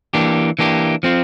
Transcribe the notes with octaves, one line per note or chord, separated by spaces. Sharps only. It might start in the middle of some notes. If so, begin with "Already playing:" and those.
E3 A#3 D4 G4
E3 A#3 D4 G4
F3 C4 F4